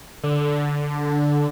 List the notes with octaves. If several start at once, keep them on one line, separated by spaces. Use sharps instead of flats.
D3